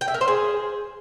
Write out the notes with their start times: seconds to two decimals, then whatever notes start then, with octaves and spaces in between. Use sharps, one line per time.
0.01 G5
0.08 E5
0.14 A#4
0.21 C5
0.28 G#4